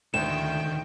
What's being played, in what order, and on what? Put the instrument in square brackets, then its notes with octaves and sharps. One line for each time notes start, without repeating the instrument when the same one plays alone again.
[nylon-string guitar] D2 [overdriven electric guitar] D3 D#3 [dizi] G5 [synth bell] E7